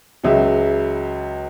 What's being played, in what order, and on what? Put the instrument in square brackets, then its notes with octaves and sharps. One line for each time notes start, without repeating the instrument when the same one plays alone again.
[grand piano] C#2 C#3 F#3 E5